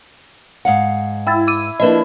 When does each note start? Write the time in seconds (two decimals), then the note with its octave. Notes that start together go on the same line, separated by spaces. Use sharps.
0.65 G#2 F5 F#5
1.27 E4 G5 E6 A6
1.47 D6 E6 D#7
1.80 F3 A#3 D4 E4 B4 D#5